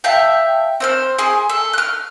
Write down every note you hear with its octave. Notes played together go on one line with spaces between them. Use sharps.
E5 F5 G5 A5
C4 C5 F6
G#4 G#5 C6
A4
F6 F#6